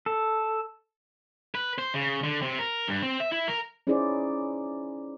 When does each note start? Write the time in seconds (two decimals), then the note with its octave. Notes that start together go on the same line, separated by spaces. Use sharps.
0.06 A4
1.55 B4
1.78 C5
1.94 C#3
2.23 D3
2.42 C3
2.59 A#4
2.88 G2
3.03 C4
3.20 E5
3.32 E4
3.48 A#4
3.87 C#4 D#4 E4 G#4 C5 D5